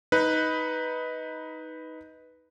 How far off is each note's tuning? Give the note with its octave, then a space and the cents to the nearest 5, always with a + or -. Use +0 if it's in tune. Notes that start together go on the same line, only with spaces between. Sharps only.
D#4 +15 B4 +0